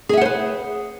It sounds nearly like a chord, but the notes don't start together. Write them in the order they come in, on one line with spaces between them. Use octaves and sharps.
G#4 E5 F#5 C5 B4